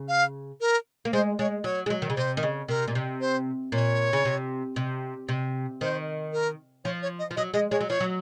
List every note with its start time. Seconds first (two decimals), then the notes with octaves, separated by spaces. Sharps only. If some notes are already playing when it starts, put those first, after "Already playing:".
Already playing: C#3
0.08 F5
0.61 A#4
1.05 A#3
1.13 G#3 C5
1.39 G#3 C#5
1.64 F#3 C#5
1.86 G#3
1.90 F#3
2.02 D#3
2.10 C#3
2.16 C3 C5
2.37 D#3
2.43 C#3
2.68 C3 A#4
2.88 A#2
2.95 C3
3.21 C5
3.72 A#2 C#5
4.13 C#3
4.25 C3
4.76 C3
5.29 C3
5.81 D#3 C5
6.33 A#4
6.85 F3 C#5
7.02 C#5
7.19 D#5
7.31 F3
7.36 F#3 D#5
7.54 G#3 D#5
7.71 G#3 C#5
7.81 F#3
7.89 F3 C#5
8.00 F#3